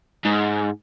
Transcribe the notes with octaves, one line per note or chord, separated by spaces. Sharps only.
G#2